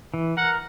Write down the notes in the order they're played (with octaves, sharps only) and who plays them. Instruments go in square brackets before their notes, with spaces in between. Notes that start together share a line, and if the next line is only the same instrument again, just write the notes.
[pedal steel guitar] E3
[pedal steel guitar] A#4 [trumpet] F#5